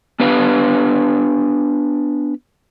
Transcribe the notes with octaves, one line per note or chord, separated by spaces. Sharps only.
B3 D4 G4 B4 F5